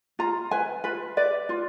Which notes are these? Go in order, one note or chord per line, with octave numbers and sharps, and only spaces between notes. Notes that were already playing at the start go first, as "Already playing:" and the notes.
F4 A#5
B4 G#5
F4 B4
B4 D5
F4